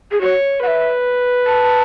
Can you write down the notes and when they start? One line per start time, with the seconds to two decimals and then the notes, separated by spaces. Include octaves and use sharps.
0.12 G#4
0.21 F#4 C#5
0.63 B4 E5 F#5
1.47 A5